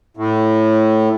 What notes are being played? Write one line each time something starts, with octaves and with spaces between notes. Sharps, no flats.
A2